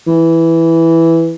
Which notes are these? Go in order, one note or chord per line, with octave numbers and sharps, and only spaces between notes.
E3